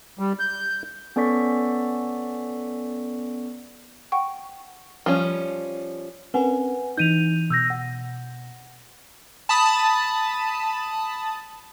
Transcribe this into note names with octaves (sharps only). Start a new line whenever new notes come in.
G3
G6
B3 C#4 A4 D5 C#6 B6
F#5 G5 C#6
F3 G3 C#4
C4 C#4 A#4 B4 F#5 G#5
E3 D#4 G6 D#7 F7
B2 E6 G6 A#6
F#5
A5 B5 D#6